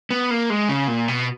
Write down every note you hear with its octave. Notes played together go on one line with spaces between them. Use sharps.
B3
A#3
G#3
C#3
A#2
B2